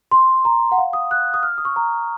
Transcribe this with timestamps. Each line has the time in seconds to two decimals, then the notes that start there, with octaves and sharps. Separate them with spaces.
0.11 C6
0.45 A#5
0.72 F#5
0.78 F5
0.93 D#6
1.11 F#6
1.34 D#6
1.43 F6
1.58 D#6
1.65 C#6
1.76 A#5